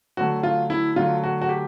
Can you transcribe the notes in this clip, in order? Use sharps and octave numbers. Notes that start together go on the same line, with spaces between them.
D3 F#3 A3 F#4
F4
E4
D3 F#3 A3 F4
F#4
F#4
G4